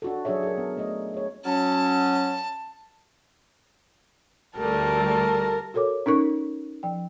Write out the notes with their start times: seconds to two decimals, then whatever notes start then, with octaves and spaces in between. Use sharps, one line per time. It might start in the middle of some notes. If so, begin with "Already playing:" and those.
0.02 D4 F#4 A4
0.25 F#3 D4 F#4 G#4 C#5 E5
0.43 G#4 A#4
0.58 B3
0.77 A3 D#5
1.14 G#4 C#5
1.45 F#3 C#4 A5
4.57 D2 G3 A3 A#4 A5
5.74 F#4 A4 A#4 C#5 D6
6.06 C#4 D#4 A#4 C#6
6.83 F3 G5